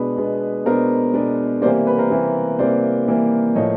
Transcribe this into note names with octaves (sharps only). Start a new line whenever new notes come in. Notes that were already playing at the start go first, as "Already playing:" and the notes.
Already playing: B2 G#3 B3 D4 B4
B2 G#3 B3 D4
B2 G#3 B3 D4 A#4 C5
B2 G#3 B3 D4
C3 E3 G3 A#3 C5 D5
B4
A#4 C5
C3 E3 G3 A#3
C3 E3 G3 A#3 C5 D5
C3 E3 G3 A#3
A2 F3 A#3 C#5 D#5